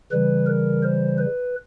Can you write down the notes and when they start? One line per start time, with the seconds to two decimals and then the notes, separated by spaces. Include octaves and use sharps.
0.11 C#3 E3 G3 B4
0.46 A#4
0.83 C5
1.18 B4